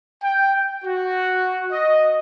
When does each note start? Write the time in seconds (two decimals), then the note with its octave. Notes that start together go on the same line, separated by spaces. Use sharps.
0.23 G5
0.84 F#4
1.71 D#5